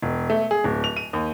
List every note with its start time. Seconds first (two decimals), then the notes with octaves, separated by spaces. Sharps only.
0.02 E1
0.30 A3
0.51 G#4
0.64 D1
0.84 F7
0.97 D#7
1.13 D#2